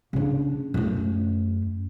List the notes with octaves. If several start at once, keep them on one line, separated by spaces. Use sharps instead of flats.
C#3 D4
F#2 A3